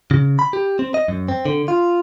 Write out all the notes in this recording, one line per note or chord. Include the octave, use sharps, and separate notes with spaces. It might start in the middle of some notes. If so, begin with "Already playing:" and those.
C#3
B5
G4
C4
D#5
F#2
C4
D3
F4